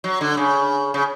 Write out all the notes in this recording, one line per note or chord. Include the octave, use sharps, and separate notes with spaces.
F#3
D3
C#3
C#3